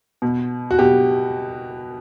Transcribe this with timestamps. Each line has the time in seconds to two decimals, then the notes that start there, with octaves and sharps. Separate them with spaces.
0.22 B2
0.71 F#4
0.79 B2 G4